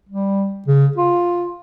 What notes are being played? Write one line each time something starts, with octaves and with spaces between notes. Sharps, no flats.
G3
C#3
F4